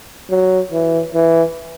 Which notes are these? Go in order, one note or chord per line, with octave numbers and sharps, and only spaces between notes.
F#3
E3
E3